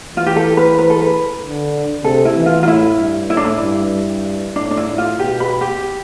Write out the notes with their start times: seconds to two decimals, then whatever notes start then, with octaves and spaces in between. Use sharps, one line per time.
0.16 E3 F4
0.26 G4
0.36 A4
0.57 B4
0.79 B4
0.90 A4
1.02 B4
1.42 D3
2.04 C3 A4
2.25 E4
2.36 E3
2.46 F4
2.63 F4
2.67 A2 E4
2.99 G2
3.30 A2 E4
3.37 D4
3.44 E4
3.62 G2
3.93 G2
4.56 A2 D4
4.71 D4
4.77 E4
4.88 A2
4.98 F4
5.19 B2 G4
5.40 B4
5.61 G4